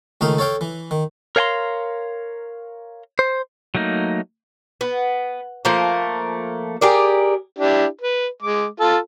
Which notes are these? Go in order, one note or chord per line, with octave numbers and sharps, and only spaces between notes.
C#2 D#3 A3 D#4 F5
A4 C#5 F5 G5
E3
D#3
A#4 C#5 F5 G5 A#5 C6
C5
F#3 A3 A#3 D#4
B3
F3 A3 A#3 A#4
G4 G#4 A#4 D5
D4 E4 G4
B4
G#3 D6
F4 A4